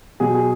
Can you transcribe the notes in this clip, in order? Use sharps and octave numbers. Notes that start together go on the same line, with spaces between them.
B2 F#3 G#4
G#4